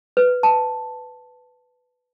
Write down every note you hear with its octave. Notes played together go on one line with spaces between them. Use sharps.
B4
A5